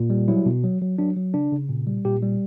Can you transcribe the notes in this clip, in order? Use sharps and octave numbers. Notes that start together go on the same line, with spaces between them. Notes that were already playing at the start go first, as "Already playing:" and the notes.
Already playing: A#2
G3
F#3 E4
B2
F#3
F#3
F#3 D4
F#3
C#3 D4
C#3
A#2
G3
A#2 G4
G3